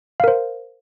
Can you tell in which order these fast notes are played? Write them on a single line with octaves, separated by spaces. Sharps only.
F5 A#4 C5